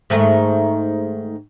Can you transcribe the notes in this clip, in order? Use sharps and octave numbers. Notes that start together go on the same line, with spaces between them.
G#2 D#3 A3